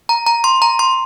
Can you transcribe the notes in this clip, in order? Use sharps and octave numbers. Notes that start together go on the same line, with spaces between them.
A#5
A#5
C6
A#5
C6